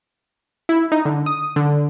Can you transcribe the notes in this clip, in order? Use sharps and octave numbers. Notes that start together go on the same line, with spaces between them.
E4
D#4
D3
D#6
D3